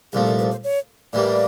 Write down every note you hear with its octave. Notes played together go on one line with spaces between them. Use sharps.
C2 A#2 F3 A3 G#4
A#4
B4
C5
C#5
A2 E3 G3 A#3 D5